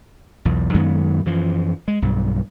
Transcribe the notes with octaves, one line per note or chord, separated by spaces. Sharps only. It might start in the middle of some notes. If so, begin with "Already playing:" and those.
B1 E2
F#2 D#3 G#3 B3
F#2 E3 F3
G#3
B1 G2